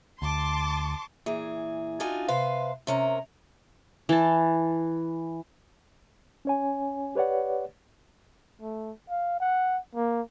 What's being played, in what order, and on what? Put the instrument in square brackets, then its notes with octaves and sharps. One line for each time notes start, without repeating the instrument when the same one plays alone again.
[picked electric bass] D2 [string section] A5 C6 D6
[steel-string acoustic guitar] A#2 E3 G#4
D4 D#4 F4 F#4 G#5
C3 B4 C5 F5
C3 C#4 A#4
[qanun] E3 A5
[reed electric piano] C#4 C#5 G#5
G4 B4 C#5 D5 F#5
[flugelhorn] A3
F5
F#5
A#3